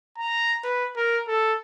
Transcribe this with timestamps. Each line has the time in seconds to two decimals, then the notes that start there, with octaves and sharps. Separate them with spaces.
0.18 A#5
0.64 B4
0.96 A#4
1.28 A4